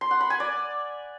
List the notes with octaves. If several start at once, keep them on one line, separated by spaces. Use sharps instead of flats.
C6
F#5
B5
G#5
D5